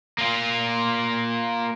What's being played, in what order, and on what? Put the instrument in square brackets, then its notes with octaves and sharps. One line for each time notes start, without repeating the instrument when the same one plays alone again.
[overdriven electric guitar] A#3 F4